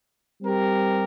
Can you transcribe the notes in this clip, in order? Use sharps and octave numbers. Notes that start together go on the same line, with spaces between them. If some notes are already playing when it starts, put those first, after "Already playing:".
G3 C4 G4 A#4